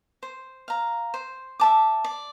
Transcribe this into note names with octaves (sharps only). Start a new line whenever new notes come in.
C5
F5 A#5
C5
E5 A5 D6
D5